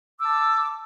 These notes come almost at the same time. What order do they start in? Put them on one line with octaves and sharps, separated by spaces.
D6 E6 A5